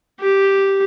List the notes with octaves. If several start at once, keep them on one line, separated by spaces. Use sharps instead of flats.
G4